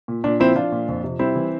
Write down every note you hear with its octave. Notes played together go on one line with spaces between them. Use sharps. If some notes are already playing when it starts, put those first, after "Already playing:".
A#2
A#2 D4
F3 C4 E4
F3 D4 F4
A#2
F2
C3
G3 C4 E4
E3